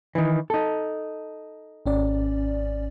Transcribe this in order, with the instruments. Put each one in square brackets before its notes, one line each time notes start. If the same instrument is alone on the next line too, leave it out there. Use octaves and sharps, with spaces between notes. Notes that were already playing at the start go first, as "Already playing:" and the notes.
[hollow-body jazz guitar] D#3 E3
D#4 A4
[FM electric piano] G#1 C#4 D5